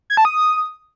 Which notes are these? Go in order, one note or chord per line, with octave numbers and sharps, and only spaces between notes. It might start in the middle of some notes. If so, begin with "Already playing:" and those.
G#6
A5
D#6